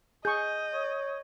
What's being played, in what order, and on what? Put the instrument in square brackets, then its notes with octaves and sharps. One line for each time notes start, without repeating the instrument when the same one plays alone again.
[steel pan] G#4 C#6 [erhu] D#5 [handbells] G6
[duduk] C#5